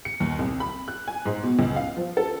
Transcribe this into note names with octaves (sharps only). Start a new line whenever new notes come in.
C#7
D#2
C2
B5
F#6
G#5
G#2
B2
C#2
F5
F3
A4